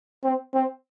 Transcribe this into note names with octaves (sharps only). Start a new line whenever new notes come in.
C4
C4